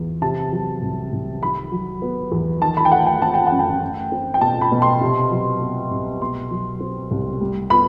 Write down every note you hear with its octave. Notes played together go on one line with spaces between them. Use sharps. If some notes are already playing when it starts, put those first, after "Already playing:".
Already playing: E2
C3 A5
F#3
C2
C2
D#3 B5
F#3
B3
E2
D#3 A5
B5
G5
A3 F#5
G5
C4 A5
G5
F#5
F#2
G5
A3
C4
G5
B2 A5
B5
B2
C6
C3
F#3
B3
C2
B2 C6
F#3
C4
C2
G3
B3 B5